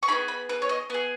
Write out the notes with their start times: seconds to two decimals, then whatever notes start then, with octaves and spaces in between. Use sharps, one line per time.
0.03 C#6
0.08 D#4 G#4 B5
0.12 B3
0.28 B5
0.49 B4
0.62 C#5
0.69 D#5
0.90 B3 G#4